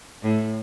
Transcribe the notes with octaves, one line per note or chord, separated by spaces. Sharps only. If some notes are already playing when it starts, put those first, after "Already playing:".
A2